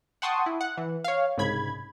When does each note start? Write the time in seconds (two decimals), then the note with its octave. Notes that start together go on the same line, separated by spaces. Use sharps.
0.22 F#5 G5 A5 C6 C#6 D#6
0.46 E4
0.61 F#5
0.77 E3
1.04 C#5 F5
1.38 C2 G#2 C#3 B5 G#6